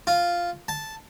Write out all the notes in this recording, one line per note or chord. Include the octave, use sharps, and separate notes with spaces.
F4
A5